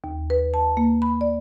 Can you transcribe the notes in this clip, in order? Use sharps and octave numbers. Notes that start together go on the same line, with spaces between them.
D#2
B4
A5
A#3
B5
D5